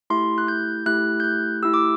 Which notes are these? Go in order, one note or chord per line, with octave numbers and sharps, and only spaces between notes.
A3 E4 G4 C6
F#6
G6
A3 E4 G4 F#6
G6
F#6
A3 E4 G4 E6
D6